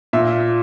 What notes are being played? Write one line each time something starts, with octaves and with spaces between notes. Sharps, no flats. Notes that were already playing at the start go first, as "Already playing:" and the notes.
A#2 E5